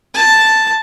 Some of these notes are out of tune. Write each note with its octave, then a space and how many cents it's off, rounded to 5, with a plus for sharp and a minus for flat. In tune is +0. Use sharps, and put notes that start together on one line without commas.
A5 +0